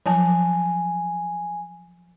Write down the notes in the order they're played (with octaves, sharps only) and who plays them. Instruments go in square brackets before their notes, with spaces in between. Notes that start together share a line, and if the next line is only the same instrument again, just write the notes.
[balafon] F3 F#3 A5 [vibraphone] G#5